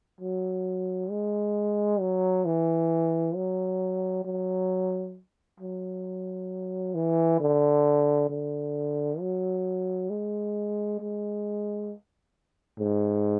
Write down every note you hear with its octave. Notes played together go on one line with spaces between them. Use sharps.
F#3
G#3
F#3
E3
F#3
F#3
F#3
E3
D3
D3
F#3
G#3
G#3
G#2